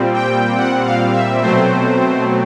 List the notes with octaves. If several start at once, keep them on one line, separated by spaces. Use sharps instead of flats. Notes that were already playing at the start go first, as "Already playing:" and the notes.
Already playing: A#2 G3 C4
G5
F#5
F5
E5
B2 F#3 A3 C4 C5